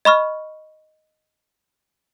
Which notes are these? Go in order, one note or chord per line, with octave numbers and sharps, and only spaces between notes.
D#5 B5 C#6 F6